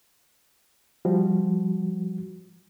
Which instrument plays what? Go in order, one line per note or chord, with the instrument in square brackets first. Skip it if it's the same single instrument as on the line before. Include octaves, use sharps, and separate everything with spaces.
[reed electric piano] F3 G3 F#4